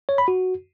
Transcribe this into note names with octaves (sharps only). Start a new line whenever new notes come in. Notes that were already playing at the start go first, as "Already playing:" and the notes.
C#5
B5
F#4